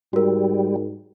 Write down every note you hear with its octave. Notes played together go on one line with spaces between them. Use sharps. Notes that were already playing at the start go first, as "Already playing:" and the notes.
G#2 G3 F#4 A#4